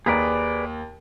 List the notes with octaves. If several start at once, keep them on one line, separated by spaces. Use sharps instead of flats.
D#2 G#4 B4 D5 A#5